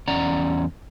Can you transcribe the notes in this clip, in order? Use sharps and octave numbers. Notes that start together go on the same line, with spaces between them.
E2 C#4 D5 F#5 A#5